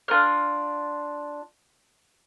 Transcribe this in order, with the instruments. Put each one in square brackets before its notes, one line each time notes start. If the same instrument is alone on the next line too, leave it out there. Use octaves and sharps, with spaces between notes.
[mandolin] D4 F4 A#4 F6